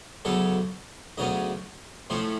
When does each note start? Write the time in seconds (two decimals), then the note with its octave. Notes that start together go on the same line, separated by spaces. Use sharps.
0.25 D2 C#3 F#3 B3 A4
1.18 D2 C#3 F#3 B3 D#5
2.10 A2 F3 A3 C#4 C5